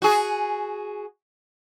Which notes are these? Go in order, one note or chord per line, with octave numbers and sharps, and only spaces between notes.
F#4 G#4